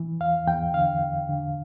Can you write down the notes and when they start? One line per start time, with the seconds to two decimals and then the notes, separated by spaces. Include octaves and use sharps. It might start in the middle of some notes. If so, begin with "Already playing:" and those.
Already playing: E3
0.20 E2 F5
0.47 E2 G5
0.74 D3 F5
1.01 E2
1.28 D3